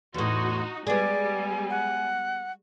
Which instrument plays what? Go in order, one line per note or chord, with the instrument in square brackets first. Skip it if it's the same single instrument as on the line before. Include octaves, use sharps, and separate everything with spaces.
[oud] E2 A2 [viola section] D#4 F#4 [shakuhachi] C6
[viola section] G3 G#3 [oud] B3 G#4 [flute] D5 [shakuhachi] G#5
[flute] F#5